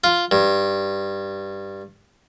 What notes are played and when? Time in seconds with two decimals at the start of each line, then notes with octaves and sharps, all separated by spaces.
0.04 F4
0.31 G2